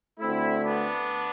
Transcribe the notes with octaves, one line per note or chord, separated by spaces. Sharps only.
D2 D3 A3 C4 E4
B3 D4